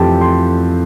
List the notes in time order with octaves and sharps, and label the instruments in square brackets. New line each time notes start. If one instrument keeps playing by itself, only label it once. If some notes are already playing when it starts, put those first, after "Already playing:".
Already playing: [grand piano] F2 E3 A3 E4 G4 G5 A5
C6